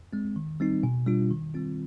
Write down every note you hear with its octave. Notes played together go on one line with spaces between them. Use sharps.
G#3 C4
D#3
G3 C4 D#4
B2
G3 D4 F4
D#3
G3 C4 F4